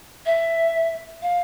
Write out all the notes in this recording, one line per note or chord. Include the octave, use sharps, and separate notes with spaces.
E5
F5